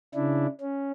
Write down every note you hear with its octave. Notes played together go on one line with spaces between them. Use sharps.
C#3 D4 E4
C#4